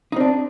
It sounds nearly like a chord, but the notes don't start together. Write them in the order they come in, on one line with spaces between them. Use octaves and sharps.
D#4 C4 D4